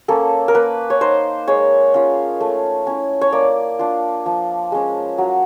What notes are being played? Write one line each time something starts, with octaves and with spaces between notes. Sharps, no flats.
A#3 C#4 A4
A#4
A#3 B4
C#5
D#4 C5
G#3 C#5
C#4 F4
A3
C#4 E4
C#5
A#3 D5
D4 F4
F3
G#3 C#4
F#3